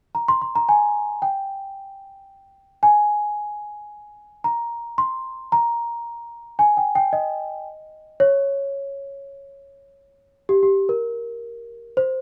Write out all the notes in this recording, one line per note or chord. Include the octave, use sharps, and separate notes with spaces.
A#5
C6
C6
A#5
G#5
G5
G#5
A#5
C6
A#5
G#5
G5
G5
D#5
C#5
G4
G4
A#4
C5